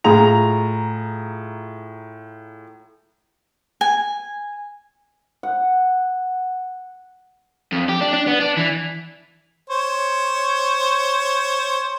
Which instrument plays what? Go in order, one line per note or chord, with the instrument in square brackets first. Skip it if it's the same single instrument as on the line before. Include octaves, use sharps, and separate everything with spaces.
[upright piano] A2 F4 G#4 A#5 F7
[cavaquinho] G#5
[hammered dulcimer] F#5
[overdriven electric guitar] F2
G4
D4
D4
B3
D4
E3
[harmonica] C5 C#5